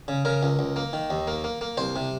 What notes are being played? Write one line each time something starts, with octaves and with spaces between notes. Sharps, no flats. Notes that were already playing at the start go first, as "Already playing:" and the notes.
C#3
C#3 A#4
C#2
C#2
A#3
D#3
D#2
A#3
A#3
A#3
C2 C5
C3